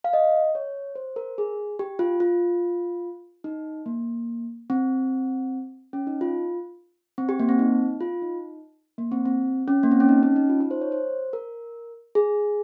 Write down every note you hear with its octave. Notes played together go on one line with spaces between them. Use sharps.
F5
D#5
C#5
C5
A#4
G#4
G4
F4
F4
D#4
A#3
C4
C#4
D#4
F4
C4
G4
A#3
C4
D#4
F4
D#4
A#3
C4
C4
C#4
A#3
C4
C#4
D#4
C#4
D#4
F4
D#4
C5
C#5
C5
A#4
G#4